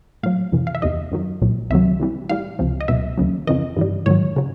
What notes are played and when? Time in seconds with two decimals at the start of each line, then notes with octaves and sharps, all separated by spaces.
0.23 A2 F#3 F5
0.52 F2 C3 E3
0.67 F5
0.75 E5
0.82 E2 C3 D#3 D#5
1.12 F#2 D#3 F#3
1.42 C2 A#2 F#3
1.70 C#2 C3 D#3 F#3 E5
2.00 C2 C3 E3 G3
2.29 A2 E3 G3 F5
2.59 C#2 C3 F3
2.80 D#5
2.88 C#2 B2 F#3 E5
3.18 D#2 C#3 F#3
3.47 F2 C#3 E3 D#5
3.77 G2 E3 G3
4.06 G#2 D#3 F#3 C#5
4.36 C#3 F#3